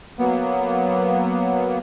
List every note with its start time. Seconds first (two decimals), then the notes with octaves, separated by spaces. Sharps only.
0.19 F#3 A#3 B3